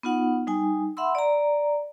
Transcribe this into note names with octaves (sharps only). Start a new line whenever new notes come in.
B3 D#4 F4 F#5
G3 D#4 G#5
E5 F#5 B5 C6 E6
D5 A#5